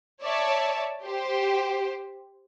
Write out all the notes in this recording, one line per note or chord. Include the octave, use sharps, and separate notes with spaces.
C#5 D5 E5 A5
G4 C5